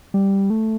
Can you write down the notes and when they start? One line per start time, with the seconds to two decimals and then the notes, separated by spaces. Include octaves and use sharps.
0.14 G3
0.50 A3